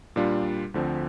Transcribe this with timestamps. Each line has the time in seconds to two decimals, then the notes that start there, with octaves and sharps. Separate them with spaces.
0.16 A#2 G3 D4 F4
0.74 D2 D3 F3 C4